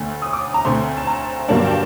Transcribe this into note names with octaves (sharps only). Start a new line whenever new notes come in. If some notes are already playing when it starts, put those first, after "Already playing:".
Already playing: D2 D3 A3
D#6
D6
A#5
D2 D3 A3 C4 C6
A5
A#5
G2 D3 F#3 A#3 D4 A5
G5
A5